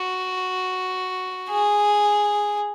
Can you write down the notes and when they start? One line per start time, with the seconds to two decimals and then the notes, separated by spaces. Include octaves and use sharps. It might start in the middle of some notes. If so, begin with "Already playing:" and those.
Already playing: F#4
1.49 G#4